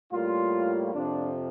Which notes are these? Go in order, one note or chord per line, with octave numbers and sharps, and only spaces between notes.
A2 G3 A#3 F4
F2 C3 F3 D4